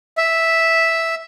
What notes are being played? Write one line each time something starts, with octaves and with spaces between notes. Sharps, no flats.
E5